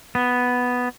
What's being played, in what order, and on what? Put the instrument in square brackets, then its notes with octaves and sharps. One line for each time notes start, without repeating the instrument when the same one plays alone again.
[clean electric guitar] B3